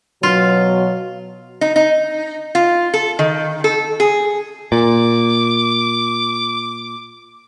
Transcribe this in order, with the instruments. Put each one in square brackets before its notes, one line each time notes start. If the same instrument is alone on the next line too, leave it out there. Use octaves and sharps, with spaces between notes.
[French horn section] B2 F#3 [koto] F4
[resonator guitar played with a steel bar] D#4
D#4
F4
A4
D#3
A4
G#4
[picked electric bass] A#2 [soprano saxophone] D6